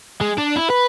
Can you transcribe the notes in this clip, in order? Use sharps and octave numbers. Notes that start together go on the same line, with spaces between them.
G#3
D4
E4
B4